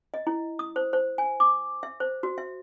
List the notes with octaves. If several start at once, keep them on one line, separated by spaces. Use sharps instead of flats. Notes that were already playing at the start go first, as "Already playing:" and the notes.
D#5
E4
D#6
C5
C5
G#5
D6
E5
C5
F#4
E5